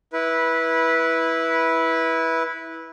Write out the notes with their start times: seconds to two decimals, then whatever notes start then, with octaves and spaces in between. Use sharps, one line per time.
0.13 E4 B4